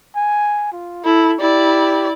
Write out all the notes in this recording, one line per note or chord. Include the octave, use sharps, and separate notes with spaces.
G#5
F4
E4 A4
E4 G4 D5